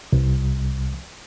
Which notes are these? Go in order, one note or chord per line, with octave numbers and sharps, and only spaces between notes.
C2